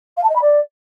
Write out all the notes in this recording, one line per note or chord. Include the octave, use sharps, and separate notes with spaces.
F5
A5
D#5
B5
D5